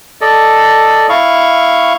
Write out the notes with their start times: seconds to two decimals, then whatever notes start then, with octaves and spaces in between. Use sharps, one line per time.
0.21 A4 D5 D#5
1.09 E4 F5 C#6